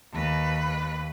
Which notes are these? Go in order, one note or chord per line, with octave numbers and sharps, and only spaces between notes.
D#2 B4